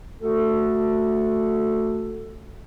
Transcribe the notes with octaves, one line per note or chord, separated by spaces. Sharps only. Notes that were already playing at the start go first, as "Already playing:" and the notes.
A3 F#4 A4